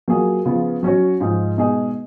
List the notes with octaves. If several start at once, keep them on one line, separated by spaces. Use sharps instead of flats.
F#3 A#3 F4 G#4
C#3 F3 B3 F4
F#3 C#4 F#4 C#5
G#2 F3 G#3 D#4 G#4
B2 G#3 D#4 G#4 D#5